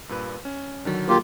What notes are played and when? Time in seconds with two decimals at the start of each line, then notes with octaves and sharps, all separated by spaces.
0.09 G2 A#2 B4
0.45 C#4
0.85 D3 D#3 F#3
1.09 A#3 F4 G4